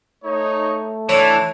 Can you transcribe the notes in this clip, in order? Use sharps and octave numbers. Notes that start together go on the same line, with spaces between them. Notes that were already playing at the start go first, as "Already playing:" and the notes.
A3 D#4 C#5
E3 D4 E4 C#5 A5